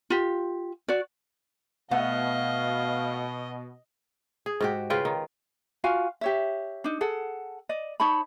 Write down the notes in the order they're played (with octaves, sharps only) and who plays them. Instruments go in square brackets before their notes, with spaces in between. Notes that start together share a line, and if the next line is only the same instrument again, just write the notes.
[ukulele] F4 G4
F#4 D5
[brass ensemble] B2 [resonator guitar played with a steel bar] A3 B3 F#5 [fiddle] D#5 [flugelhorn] F5
[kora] G#4
G#2 F#4 G4
C#3 F4 B4 G5
D#3
[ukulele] F4 F#4 F5 G#5
G4 C#5 E5
D4 D#4
G#4 A4 F#5
D5 D#5
D#4 C#5 A5 B5